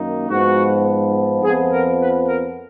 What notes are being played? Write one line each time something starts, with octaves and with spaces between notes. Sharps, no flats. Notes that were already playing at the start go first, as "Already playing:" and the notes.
Already playing: F#2 D#3 A#3 D#4
G#2 F3 B3 F#4
F2 F3 B3 G#4
A#4
B4
A#4